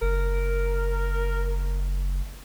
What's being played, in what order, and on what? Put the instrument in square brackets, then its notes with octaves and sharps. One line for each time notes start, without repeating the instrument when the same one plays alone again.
[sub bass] F#1 [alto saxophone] A#4